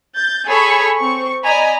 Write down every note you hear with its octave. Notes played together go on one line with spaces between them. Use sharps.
G6 A6
G#4 A4 C#5 G#5 B5 C#6
C4 C#6
D5 D#5 G#5 A#5 B5